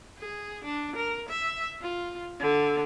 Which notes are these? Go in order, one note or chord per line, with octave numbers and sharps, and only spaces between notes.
G#4
D4
A#4
E5
F4
D3